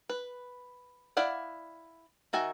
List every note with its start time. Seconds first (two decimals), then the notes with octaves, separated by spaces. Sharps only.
0.10 B4
1.17 E4 D5 F5 F#5
2.33 D#3 F#4 E5 G#5